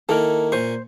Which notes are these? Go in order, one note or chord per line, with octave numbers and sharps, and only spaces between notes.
D#3 A#3 E4 A4 A#4
A#2 C5 G#5 C#6